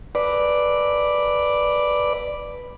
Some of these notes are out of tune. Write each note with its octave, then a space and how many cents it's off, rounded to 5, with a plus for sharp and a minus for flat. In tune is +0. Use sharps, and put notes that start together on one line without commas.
B4 +0 D5 +0